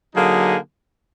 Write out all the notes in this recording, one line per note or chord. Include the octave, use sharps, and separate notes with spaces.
D3 F#3 A#3 D#4 G#4